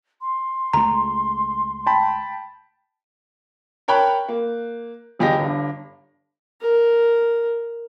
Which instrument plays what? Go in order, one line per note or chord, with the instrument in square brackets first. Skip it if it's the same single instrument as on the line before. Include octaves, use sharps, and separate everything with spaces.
[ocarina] C6
[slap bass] C#2 A3 [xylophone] A#5
[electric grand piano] G5 A5 B5
[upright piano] A#4 C#5 G5 A5 B5 F#6
A#3
G1 E2 G4 D#5 A#6
G1 G2
[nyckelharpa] A#4